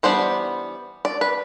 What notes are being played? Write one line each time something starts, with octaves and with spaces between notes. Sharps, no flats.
E3 G3 B3 D4 C5
D5
B4